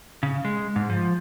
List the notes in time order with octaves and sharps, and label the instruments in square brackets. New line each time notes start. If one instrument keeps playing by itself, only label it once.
[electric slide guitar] C#3
G#3
G#2
F3